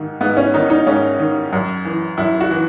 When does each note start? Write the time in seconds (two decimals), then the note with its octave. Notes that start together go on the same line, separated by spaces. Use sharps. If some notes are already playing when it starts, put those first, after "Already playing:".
Already playing: G#2 D#3
0.21 G#2 B3
0.37 C#4
0.54 D#3 D#4
0.70 D#4
0.87 G#2 C#4
1.19 D#3
1.53 F#2
1.85 E3
2.18 F#2 E4
2.40 F#4
2.51 E3